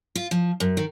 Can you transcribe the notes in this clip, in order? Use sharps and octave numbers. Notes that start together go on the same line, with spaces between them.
F4
F3
F#2
D#3